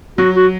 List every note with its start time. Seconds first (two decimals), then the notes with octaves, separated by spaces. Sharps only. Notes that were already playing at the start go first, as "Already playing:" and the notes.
0.18 F#3 F#4
0.35 F#4